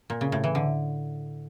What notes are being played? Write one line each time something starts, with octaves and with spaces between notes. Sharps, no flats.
A#2
C#3
A2
E3
D3